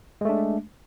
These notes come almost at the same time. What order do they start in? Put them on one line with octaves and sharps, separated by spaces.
G#3 A3 D4